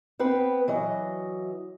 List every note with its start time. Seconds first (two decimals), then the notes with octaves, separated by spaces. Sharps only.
0.19 B3 C4 B4
0.68 E3 F#3 D#5